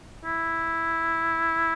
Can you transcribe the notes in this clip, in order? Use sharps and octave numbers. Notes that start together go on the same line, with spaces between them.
E4